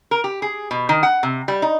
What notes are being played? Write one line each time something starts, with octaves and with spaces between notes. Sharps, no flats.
A#4
G4
G#4
B2
D#3
F#5
C3
G3
D#4